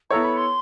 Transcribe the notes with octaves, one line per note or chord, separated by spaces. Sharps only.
B3 E4 A4 C#5 A#5
B5
C6